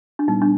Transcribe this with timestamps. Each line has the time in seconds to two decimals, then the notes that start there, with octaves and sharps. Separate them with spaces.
0.19 D4
0.28 A#2 G3 B3 D#4
0.42 D4